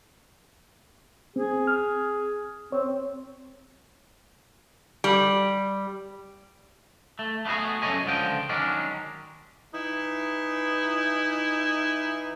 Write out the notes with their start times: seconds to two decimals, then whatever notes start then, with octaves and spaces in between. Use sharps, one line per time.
1.36 C4 G#4
1.67 F6
2.72 C4 C#5
5.04 G3
7.19 A3
7.45 A3 B3 E4 F#4 G#4
7.82 F#2 D#3 A4 C#5 D#5 G#5
8.05 C#2 D3 F3 G5
8.49 D#3 F#3 G#3 C#4 D4
9.74 E3 D#4 E4